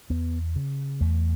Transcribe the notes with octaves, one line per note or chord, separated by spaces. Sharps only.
E2 B3
C#3
E2 A3